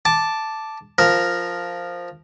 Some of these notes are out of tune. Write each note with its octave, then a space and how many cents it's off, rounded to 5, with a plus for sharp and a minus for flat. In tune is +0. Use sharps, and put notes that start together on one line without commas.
A5 +0 D6 +0
F3 +5 A#4 +0